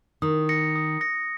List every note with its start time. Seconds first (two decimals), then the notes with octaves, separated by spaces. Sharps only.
0.22 D#3 D#6
0.49 A#6 C#7
0.76 D#6
1.01 A#6 C#7